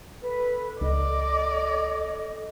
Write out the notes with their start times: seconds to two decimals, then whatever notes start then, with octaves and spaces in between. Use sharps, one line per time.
0.22 A4 B4
0.81 C#2 D5 D#5